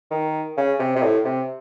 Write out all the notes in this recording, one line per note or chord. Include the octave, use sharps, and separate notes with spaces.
D#3
C#3
C3
C3
A2
C3